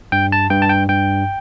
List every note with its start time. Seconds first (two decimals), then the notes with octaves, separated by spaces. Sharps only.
0.12 G2 G5
0.32 A5
0.50 G2 G5
0.62 A5
0.69 G5
0.89 G2 G5